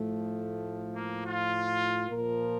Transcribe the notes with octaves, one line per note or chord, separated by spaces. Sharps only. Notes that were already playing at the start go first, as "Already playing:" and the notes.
Already playing: A2 F3 A3
A#3
F4
A#2 F3 A#4